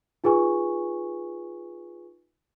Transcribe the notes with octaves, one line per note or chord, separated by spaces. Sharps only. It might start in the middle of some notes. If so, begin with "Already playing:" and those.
D#4 F4 G#4 B4 G#5 C#6